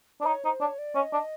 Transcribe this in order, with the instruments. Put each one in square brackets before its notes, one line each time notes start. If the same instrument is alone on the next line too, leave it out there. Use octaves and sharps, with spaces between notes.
[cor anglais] D4 [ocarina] C5
[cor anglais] D#4 [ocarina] C#5
[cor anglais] D#4 [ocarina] C5
[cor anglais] D4 [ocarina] C#5
[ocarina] D5
[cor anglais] C#4 [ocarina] D#5
[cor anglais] D4